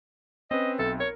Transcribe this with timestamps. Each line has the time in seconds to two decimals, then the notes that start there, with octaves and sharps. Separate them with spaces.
0.51 C4 C#4 B4 D#5
0.79 B1 C4 A4 E5
1.00 A#4 C#5